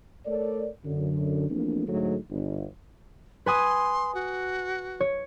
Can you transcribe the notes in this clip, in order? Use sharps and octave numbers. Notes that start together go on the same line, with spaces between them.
A3 A4 A#4 C#5 D5
F#2 D3
E2 F3 A3 A#3 C4 D4
D2 G#2 F#3 A3
G1
B4 G#5 C6 D#6
F#4
C#5